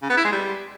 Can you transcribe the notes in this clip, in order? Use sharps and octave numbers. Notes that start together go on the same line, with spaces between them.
C#3
B3
E4
G#3
G3